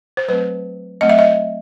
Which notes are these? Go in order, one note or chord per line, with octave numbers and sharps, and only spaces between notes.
C5
F#3 A3 C4 B4
F#3 A3 C4 D#5
E5
D#5